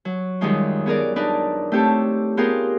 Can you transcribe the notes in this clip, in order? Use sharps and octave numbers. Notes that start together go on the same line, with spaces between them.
F#3
F#2 D#3 G3 G#3 D#4 F4
B3 G#4 A#4 D5
D4 D#4 A#4 B4 D5
A3 C4 G4 A4 C#5
B3 F4 G4 G#4 A#4